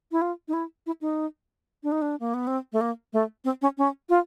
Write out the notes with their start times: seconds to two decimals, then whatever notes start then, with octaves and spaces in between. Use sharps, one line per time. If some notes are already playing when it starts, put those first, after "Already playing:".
0.12 E4
0.22 F4
0.48 D#4
0.53 E4
0.86 E4
1.01 D#4
1.83 D4
1.92 D#4
2.02 D4
2.20 A#3
2.34 B3
2.47 C4
2.73 A3
2.81 A#3
3.13 A3
3.45 C4
3.62 C#4
3.78 C#4
4.09 F4